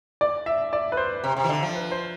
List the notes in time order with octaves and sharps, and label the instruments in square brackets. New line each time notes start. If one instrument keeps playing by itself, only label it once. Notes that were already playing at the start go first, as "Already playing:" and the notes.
[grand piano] D5
E5
D5
B4
C5
[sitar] C3
C3
E3
D3
F3
[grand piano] B4
C5